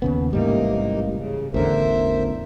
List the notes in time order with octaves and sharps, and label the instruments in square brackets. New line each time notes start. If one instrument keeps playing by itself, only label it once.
[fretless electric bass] D#2 C#3 B3
[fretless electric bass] A1 G#2 G3 [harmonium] C3 A#3 D#4
[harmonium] C#3
[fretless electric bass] A1 E2 D3 [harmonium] A#4 C5 E5